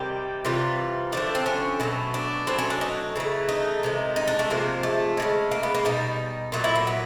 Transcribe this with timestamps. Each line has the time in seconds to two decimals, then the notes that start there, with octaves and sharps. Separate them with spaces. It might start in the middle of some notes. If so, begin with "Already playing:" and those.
Already playing: C3 D#3 G3 G4
0.45 C3 E3 G3 F4
1.12 D3 F3 A3 D4
1.35 C4
1.46 C#4
1.80 B2 F#3 A3
2.14 D4
2.47 B2 F#3 A3 C4
2.58 C#4
2.70 D4
2.81 D#4
3.16 C#3 E3 A3
3.49 D#4
3.83 C3 D#3 G#3
4.16 D#4
4.28 D4
4.39 A3
4.50 C3 F3 G#3 A#3
4.83 A3
5.17 C#3 F3 G#3
5.51 A#3
5.63 B3
5.75 A#3
5.85 B2 G3 D#4
6.52 A#2 F#3 A3 D#4
6.64 E4
6.75 A#3
6.87 B3